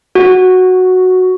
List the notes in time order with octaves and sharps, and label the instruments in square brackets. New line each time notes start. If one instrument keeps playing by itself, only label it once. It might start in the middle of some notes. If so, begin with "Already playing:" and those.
[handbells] F#4